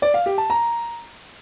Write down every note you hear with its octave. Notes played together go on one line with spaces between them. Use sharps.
D5
F5
G4
A5
A#5